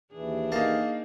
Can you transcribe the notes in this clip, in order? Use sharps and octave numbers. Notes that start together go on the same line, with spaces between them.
D#2 E3 D4 G#4
A#3 D#4 F5 A5